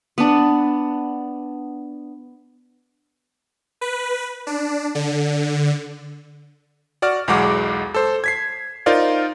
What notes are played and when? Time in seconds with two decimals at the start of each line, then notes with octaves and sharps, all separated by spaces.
0.18 B3 D4
3.81 B4
4.47 D4
4.95 D3
7.02 F#4 D5 F#5 F6
7.28 B1 E2 G#3 F#4 F#5 D6
7.94 A4 C5
8.24 G#6 B6 C7
8.86 D#4 F4 A#4 C5 D5